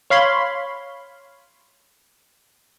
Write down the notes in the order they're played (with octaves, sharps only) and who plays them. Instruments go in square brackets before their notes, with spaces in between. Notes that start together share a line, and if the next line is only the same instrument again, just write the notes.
[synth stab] C#5 F5 B5 C6